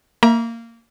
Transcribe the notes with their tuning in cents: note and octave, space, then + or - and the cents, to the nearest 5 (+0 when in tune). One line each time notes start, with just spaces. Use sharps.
A#3 -15 E5 +0 A#5 +30